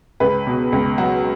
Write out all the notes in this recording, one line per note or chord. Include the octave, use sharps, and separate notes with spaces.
C#2 B4
B2
C#2
F#3 F#4